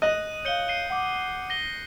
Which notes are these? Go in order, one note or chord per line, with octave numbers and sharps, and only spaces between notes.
D#5 D#6 F#6 D#7
C#5 F5 G6 C#7 G7
C7 D#7 G7
F#5 D6
A#6 G7